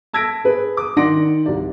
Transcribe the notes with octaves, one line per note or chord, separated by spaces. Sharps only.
A5 E6 G#6 A#6 B6 D7
G#4 B4
D6 D#6
D#3 D5 F#5 C6 A#6 D7
C2 D5